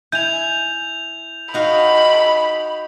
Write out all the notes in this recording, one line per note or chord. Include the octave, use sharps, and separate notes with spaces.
E4 G#5 G6 F7
D#4 F#4 F5 B5